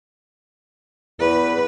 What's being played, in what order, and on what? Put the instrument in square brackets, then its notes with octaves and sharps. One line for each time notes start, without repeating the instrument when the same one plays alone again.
[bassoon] E2 [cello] B4